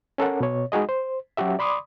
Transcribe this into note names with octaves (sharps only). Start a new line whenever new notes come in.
C#4 A4 A#4 F#5
B2 C#5
G#3 D#4 F#4 G#4 D#5
C5
F#3 C#4 F#4 G4 E5
D5 B5 C6 D6 D#6